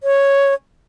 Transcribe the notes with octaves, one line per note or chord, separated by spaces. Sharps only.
C#5